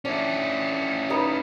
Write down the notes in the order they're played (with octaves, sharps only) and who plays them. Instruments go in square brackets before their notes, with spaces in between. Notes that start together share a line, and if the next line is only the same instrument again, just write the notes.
[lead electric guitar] C#4 E4 [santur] D4
[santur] G3 D#4 B4